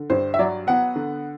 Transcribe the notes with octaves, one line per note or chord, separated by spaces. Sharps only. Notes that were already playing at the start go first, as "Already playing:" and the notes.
Already playing: D3
G2 C5
E5
F#3 D5
B3 F#5
D3